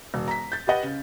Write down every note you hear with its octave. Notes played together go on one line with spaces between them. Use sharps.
E1
A#5 B6
G6 A6
G4 B4 D#5 F#5
C#3